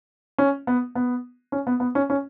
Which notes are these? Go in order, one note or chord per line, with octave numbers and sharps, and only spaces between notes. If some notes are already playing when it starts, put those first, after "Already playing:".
C#4
B3
B3
C#4
B3
B3
C#4
C#4